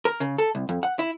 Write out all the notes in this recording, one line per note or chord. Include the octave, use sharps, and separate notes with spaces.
A#4
C#3
A4
C2
F2
F#5
E4